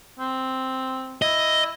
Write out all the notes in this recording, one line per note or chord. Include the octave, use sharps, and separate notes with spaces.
C4
E4 D#5